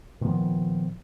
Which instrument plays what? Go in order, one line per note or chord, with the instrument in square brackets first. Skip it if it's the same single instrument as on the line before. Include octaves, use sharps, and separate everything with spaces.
[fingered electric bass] A#2 D#3 F3 B3